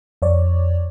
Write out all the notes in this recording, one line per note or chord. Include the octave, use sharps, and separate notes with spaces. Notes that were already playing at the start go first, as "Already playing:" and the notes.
F2 C#5 D5